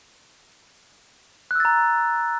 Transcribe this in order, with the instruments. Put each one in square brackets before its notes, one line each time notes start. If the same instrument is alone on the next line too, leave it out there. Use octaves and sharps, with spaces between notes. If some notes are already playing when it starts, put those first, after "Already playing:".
[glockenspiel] F#6
E6
A6
A#5